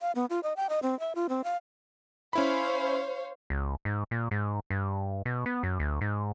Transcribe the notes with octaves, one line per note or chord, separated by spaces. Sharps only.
F5
B3
F4
D#5
G5
D#5
C4
E5
F4
C4
F5
C#4 E4 C5 C#5 F5 B5
C#2
G#2
A#2
G#2
G2
B2
B3
F#2
D2
G#2